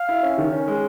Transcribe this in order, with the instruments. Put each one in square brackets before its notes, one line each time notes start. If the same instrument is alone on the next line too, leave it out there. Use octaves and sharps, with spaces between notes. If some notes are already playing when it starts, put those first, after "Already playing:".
Already playing: [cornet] F5
[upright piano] E4
C#4
D#3
C#4
G#3